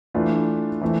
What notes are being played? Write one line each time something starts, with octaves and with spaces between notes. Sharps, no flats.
E3 A3 D4 F4 B4
E3 A3 C4